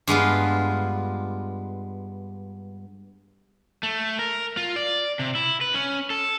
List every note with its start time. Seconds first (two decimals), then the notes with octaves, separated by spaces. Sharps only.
0.07 G2 G#3 B3 F4
3.83 A3
4.19 A#4
4.57 F4
4.76 D5
5.19 C3
5.35 E4
5.61 B4
5.74 C#4
6.10 A4